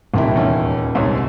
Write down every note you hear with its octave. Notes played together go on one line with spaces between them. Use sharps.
D#1 C2 D#3 E4
E2 C#4
C2 G#2 C#5